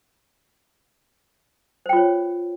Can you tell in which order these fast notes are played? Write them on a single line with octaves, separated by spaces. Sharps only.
C5 G5 F4 C#5